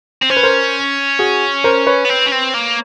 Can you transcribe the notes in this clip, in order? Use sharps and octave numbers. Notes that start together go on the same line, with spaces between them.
C4
C#4 C5
B4
A#4 C5
F#4 G#4
A#4 C5
B4 C#5
B3
C4
C#4
C4
A#3